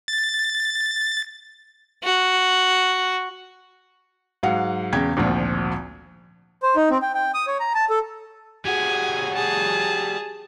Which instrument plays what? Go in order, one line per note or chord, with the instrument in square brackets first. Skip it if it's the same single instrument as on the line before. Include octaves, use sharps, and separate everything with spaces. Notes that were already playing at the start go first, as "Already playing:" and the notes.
[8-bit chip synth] A6
[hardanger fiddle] F#4
[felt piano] G#2 F#3 F5 F#5
E2 C#3 G5 G#6
G#1 D2 A#2 F3
[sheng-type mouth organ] C5
D#4
C4
G5
G5
D#6
C#5
A#5
A5
A4
[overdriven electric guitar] G3 F#4 [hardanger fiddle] G#4 [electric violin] G#5
[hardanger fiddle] G#4 [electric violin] A5